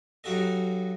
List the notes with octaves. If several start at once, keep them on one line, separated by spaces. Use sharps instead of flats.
G2 F#3 D#4 F#4 A4 D#5